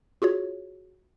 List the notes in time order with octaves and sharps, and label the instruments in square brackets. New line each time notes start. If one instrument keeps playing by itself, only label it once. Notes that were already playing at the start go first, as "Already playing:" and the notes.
[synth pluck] F4 F#4 G#4 C#5